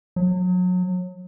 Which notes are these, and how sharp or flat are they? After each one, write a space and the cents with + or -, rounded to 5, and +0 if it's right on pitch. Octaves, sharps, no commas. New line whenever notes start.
F#3 -30